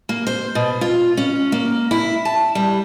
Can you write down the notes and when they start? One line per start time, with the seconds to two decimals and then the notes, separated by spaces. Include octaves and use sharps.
0.09 A#3
0.27 C5
0.55 B2
0.81 F4
1.17 C#4
1.52 A#3
1.91 E4
2.25 A5
2.55 G3